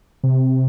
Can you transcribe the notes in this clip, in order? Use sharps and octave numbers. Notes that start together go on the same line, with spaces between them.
C3